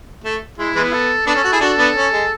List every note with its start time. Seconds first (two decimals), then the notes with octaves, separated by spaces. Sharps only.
0.24 A3
0.58 G#3 E4
0.75 E3 G#3 B3
0.93 A4
1.26 B3 D4 A4
1.35 C#4
1.44 F#4
1.52 E4 G#4
1.60 D4 F#4 A4
1.77 B3 D4
1.96 C#4
2.12 G#3